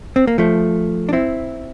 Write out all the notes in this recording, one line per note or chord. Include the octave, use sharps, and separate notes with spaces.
C4
A#3
F3 A3
D4
C4 E4